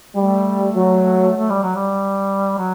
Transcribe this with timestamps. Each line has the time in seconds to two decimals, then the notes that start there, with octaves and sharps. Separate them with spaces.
0.15 G3 A3
0.76 F#3
1.36 A3
1.50 G3
1.63 F#3
1.75 G3
2.58 F#3